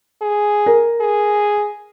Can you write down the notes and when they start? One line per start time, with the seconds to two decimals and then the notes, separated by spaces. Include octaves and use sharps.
0.22 G#4
0.66 A#4
1.01 G#4